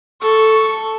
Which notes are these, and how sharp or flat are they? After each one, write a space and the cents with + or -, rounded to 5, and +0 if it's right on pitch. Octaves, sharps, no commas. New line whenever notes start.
A4 +0 C#6 +5